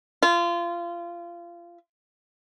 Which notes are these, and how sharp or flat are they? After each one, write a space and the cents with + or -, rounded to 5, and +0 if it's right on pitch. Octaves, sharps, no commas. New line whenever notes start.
F4 -25